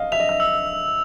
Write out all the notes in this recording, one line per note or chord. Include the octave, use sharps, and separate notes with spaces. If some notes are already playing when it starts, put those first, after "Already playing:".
Already playing: D#5 F5
E5 F7
D#5
E5
E6